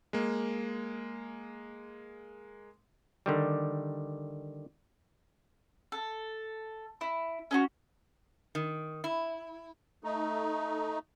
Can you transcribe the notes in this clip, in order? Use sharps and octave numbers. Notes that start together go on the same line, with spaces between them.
G#3 A#3
D3 D#3 G3
A4
E4
C#4 D#4 F#4
D#3
E4
A3 D#4